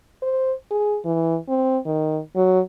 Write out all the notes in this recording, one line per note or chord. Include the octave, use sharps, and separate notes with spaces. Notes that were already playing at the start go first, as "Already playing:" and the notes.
C5
G#4
E3
C4
D#3
F#3